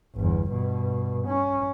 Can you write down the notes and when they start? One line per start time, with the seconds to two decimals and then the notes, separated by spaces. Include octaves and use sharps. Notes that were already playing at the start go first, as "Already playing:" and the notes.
0.15 G1 E2
0.51 G2 B2
1.27 C#4